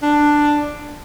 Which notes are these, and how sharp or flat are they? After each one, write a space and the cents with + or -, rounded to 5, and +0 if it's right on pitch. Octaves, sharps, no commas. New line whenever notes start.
D4 +5